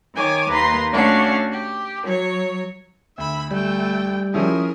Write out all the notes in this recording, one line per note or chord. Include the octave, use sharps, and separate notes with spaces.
D#3 C#5 G#5 D6
D#2 A#3 D#4 B4 A#5 C6
A3 C#4 D4 F#4 F5
G4
F#3 C#5
D2 E5 B5
G3 A3 G5
F3 C#4 E4 G#4 A#4